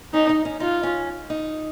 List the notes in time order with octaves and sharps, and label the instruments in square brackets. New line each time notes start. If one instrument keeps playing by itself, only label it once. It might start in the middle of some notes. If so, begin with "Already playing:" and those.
[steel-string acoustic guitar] C#4 [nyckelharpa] D#4
[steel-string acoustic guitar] D#4
C#4
[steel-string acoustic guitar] D#4 [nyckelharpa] F4
[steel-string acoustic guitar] C#4
D#4